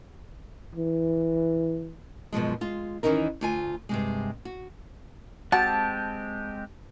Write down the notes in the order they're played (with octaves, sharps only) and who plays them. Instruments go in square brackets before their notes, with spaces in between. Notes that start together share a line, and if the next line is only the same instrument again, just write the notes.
[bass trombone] E3
[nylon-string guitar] F#2 B2 F3 G#3
G#3 F4
D#3 E3 C#4 D#4 A#4
D2 F4 G#5
G2 C3 G#3
F#4
[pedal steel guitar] G#3 C4 G4 [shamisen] F#4 [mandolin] A5